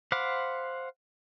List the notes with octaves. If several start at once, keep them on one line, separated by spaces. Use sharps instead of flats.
C5 F5 F#5 B5 D6